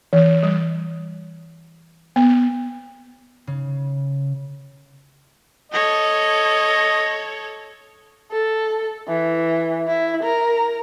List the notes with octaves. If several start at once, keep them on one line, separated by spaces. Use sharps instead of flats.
E3
G3
B3
C#3
A4 C#5 D#5
A4
E3
E4
A#4